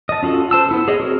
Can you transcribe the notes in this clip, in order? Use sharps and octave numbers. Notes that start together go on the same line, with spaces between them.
D#5 A5
C#4 F4 F#4 A4
C5 A5 E6
B3 E4 A4
G#4 C#5 D#5
C4 F#4 A#4